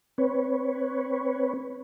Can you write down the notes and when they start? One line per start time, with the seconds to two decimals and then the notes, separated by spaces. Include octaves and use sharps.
0.18 C4 B4 C#5